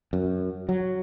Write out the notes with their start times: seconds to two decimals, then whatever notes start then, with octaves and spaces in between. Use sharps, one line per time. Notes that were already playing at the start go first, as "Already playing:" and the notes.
0.13 F#2
0.69 F#3